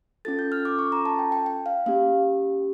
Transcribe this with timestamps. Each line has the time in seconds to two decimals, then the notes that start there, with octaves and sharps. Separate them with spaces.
0.25 C#4 F4 A4 A6
0.39 G6
0.52 F6
0.65 D6
0.79 C#6
0.92 A#5
1.05 A5
1.19 G5
1.32 G5
1.46 G5
1.66 F5
1.86 A#3 C#4 G4 F5